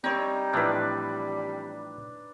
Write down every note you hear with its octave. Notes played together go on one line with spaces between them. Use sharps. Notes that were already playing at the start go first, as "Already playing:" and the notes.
G3 C4 D#4 C#5
A2 E3 F3 D4 B4